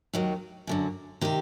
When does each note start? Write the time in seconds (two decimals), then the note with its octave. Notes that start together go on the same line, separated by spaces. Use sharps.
0.13 D#2 D#3 F#3
0.67 F#2 D3 F#3
1.21 C3 D#3 G4